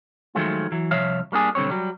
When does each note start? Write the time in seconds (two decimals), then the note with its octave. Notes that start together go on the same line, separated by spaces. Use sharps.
0.35 D#3 F3 F#3 G#3 A3 F4
0.72 E3 F#3
0.91 C2 F3 C#5 E5 F5
1.32 G3 A#3 D4 G#4
1.55 B1 D3 G3 C4 C#5
1.70 F#3 G3